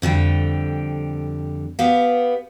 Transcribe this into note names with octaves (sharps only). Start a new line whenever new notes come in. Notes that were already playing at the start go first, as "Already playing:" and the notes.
F2 D3 G3 G5
B3 G4 F5